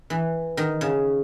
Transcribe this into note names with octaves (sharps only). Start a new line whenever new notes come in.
E3
D#3
C#3